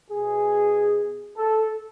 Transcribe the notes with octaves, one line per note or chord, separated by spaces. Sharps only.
B2 G#4
A4